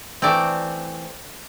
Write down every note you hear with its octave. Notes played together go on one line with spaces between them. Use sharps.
E3 A3 C4 D5